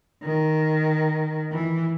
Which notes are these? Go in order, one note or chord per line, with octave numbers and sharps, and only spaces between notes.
D#3
E3